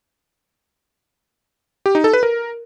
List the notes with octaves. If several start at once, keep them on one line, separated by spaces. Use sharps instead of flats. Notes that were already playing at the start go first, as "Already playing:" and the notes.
G4
D#4
A4
B4
A#4